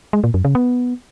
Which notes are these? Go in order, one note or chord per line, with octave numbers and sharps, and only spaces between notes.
G#3
A#2
F#2
C#3
B3